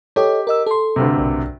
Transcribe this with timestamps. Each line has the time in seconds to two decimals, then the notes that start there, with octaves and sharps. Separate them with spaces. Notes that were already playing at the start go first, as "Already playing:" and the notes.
0.16 G4 A4 C#5 D#5
0.47 A#4 D#5 E6
0.67 A4 C6
0.96 D2 G2 C3
1.19 B1